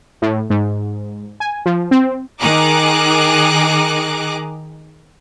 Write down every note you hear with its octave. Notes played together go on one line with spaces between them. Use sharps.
A2
G#2
G#5
F3
C4
D#3 G#4 A#5 D6 F#6